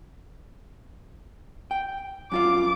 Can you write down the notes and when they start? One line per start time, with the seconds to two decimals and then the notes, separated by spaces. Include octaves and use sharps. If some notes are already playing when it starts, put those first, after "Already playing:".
1.71 G5
2.32 F#2 F4 F5 D6